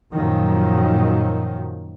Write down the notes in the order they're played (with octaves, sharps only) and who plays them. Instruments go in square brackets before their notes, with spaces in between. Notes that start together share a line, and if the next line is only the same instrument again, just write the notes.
[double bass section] F#2 A#2 D#3 F3 F#3